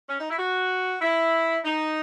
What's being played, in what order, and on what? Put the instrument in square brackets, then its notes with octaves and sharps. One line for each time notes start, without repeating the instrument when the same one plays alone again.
[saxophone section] C#4
D#4
E4
F#4
E4
D#4